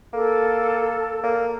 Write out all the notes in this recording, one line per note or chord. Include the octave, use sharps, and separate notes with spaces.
A#3 A4
A#3